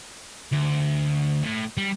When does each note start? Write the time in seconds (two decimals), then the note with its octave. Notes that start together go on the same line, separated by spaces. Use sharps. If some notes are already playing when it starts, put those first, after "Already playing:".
0.52 D2
1.44 A2
1.77 G3